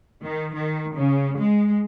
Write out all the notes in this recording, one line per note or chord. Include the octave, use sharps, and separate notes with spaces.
D#3
D#3
C#3
G#3